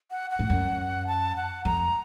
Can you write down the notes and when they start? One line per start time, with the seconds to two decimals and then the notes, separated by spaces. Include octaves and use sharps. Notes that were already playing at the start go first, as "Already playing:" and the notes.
0.11 F#5
0.30 F#5
0.39 A2
0.50 F#2
1.07 A5
1.36 F#5
1.65 F2 A#5